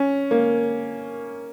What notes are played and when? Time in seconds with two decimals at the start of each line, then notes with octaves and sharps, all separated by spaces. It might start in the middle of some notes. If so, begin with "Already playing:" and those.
Already playing: C#4
0.31 A#3